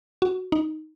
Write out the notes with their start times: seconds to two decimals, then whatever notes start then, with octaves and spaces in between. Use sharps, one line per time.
0.22 F#4
0.52 D#4